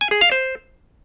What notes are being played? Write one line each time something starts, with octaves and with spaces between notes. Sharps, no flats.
G#5
G#4
F5
C5